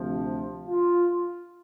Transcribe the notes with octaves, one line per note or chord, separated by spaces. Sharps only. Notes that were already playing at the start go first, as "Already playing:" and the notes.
Already playing: D2 C3 F3
F4